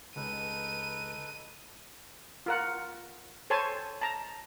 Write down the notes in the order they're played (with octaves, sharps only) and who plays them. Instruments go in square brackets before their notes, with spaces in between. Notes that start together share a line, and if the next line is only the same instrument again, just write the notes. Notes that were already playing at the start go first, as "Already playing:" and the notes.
[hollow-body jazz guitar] C#2 [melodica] D#4 A4 B4 [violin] D#7
[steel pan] F4 A#4 F#5
A4 C5 C#5 G#5 A5
A5 A#5